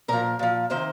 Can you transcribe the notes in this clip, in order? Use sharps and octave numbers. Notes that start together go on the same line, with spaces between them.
A#2 F3 A#4
A#2 F3
C3 D#3 C5